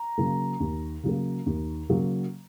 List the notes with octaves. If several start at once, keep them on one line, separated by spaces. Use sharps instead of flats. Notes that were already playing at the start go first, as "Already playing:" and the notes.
Already playing: A#5
C#3 F#3 A#3
D#2
C#3 F#3 A#3
D#2
C#3 F#3 A#3